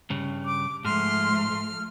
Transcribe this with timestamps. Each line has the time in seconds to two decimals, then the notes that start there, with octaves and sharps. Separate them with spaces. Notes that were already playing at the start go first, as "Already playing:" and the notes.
0.10 G2 C#3
0.45 D6
0.85 G#2 F3 A3 C6 F6